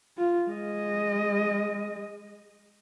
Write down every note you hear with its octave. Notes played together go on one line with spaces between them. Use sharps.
F4
G#3 D#5